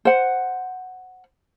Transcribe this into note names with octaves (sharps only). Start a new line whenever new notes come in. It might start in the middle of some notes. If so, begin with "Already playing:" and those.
C5 F#5